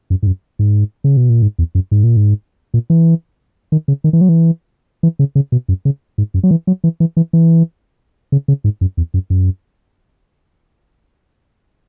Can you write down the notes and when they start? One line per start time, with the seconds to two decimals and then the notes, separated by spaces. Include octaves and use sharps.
0.10 F#2
0.23 G#2
0.27 F#2
0.59 G#2
1.04 C#3
1.17 B2
1.29 A#2
1.42 G#2
1.59 E2
1.75 F#2
1.91 G#2
2.04 A#2
2.17 G#2
2.74 A#2
2.90 E3
3.72 D#3
3.88 C#3
4.04 D#3
4.13 E3
4.21 F#3
4.29 E3
5.03 E3
5.19 C#3
5.35 C#3
5.52 B2
5.69 F#2
5.85 C#3
6.18 G#2
6.34 F#2
6.43 F#3
6.51 E3
6.67 F#3
6.84 E3
7.00 E3
7.17 E3
7.33 E3
8.32 C#3
8.48 C#3
8.64 G#2
8.81 F#2
8.97 E2
9.14 F#2
9.30 F#2